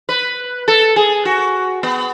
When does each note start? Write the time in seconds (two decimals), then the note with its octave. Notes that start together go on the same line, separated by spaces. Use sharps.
0.09 B4
0.68 A4
0.96 G#4
1.25 F#4
1.83 B3